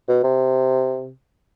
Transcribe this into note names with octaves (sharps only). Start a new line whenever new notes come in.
B2
C3